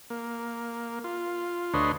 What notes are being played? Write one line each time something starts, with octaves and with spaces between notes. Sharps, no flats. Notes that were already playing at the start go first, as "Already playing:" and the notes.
A#3
F4
D2 D4 B4 C#5 D#5 C6